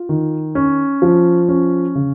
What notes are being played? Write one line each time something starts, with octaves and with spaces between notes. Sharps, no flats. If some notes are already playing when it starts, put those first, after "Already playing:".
Already playing: F4
D#3
C#4
F3
C#4
C#3